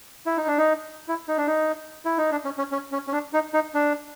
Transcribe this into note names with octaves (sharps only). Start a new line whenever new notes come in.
E4
D#4
D4
D#4
E4
D#4
D4
D#4
E4
D#4
D4
C#4
C#4
C#4
C#4
C#4
D4
D#4
D#4
D4